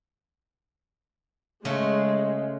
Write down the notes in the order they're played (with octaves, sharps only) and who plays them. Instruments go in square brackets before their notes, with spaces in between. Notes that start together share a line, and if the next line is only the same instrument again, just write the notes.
[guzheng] C#3 A3 [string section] G#3